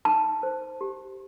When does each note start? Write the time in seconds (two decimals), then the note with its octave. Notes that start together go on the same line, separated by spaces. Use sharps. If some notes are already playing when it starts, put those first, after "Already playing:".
0.05 D#4 A5
0.43 C5
0.81 G4